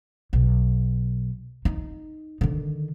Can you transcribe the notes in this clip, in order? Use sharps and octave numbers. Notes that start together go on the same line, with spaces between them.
B1
D#4
D3 D#3